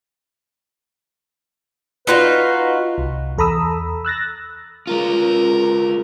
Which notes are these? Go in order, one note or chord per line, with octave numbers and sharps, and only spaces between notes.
D#4 F4 F#4 B4
C2
E2 A4 A#5 B5 D#6 E6
E6 F#6 A6 A#6
G#3 F4 A#4